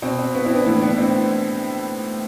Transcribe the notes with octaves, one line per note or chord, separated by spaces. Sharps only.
B2 C4
C4
B3
C4 E4
B3 D4
A2 E3
B3 D4
C4 E4